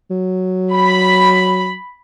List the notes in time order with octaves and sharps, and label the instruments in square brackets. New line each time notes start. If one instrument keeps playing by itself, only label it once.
[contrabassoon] F#3
[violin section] B5